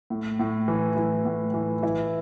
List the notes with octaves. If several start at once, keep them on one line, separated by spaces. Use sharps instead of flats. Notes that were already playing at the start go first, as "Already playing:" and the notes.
A2
A2
E3
E3
A2
E3
E3 E4